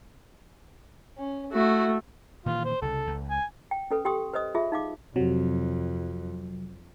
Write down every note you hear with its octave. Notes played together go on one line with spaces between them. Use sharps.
C#4
A3 E4 F#4
A#2 D#3 E3 F4
C5
C2 C#3 A4
C#2
G#5
G5
C#4 A4 B4
G4 G5 C6 D#6
B4 C5 D#5 D#6
F4 G#4 E5
D#4 F5 D6
F2 C3 F#3